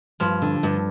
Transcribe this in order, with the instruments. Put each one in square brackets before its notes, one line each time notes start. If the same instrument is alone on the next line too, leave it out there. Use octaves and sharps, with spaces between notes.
[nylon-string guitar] G2 [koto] F3
[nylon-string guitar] D3
G2